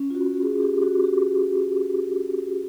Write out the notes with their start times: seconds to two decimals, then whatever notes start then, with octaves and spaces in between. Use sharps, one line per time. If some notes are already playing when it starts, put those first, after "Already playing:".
Already playing: C#4
0.10 F4
0.15 F#4
0.43 G#4
0.63 G4
0.82 F#4
1.04 G4